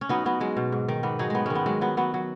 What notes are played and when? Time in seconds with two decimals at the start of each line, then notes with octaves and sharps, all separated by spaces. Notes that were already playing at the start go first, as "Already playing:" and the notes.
0.01 C#4
0.09 F#3 B3 D#4
0.26 F#3 B3
0.41 F#3 G#3
0.57 B2
0.72 G#2
0.88 D#3
1.03 G#2 B3
1.19 F#3 D#4 G#4
1.30 D#3 G#3 B3
1.46 D#3 G#3 C#4
1.55 B3
1.66 F#3 G#3
1.81 F#3 B3
1.97 F#3 B3
2.14 F#3